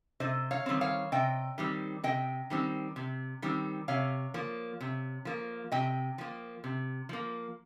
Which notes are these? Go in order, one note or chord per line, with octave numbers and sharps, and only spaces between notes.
C3 C5 D#5
C#5 F5
D#3 G3 C4
C#5 F5
C3 D#5 G5
D#3 G3 C4
C3 D#5 G5
D#3 G3 C4
C3
D#3 G3 C4
C3 C#5 F5
F3 A#3
C3
F3 A#3
C3 D#5 G5
F3 A#3
C3
F3 A#3